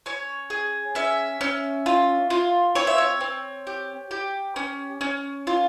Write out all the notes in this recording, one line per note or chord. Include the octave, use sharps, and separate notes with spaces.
C#4 C#5
G#4
C#4 E5
C#4
F4
F4
C4 C#5
E5
C#5
C4
G4
G4
C#4
C#4
F4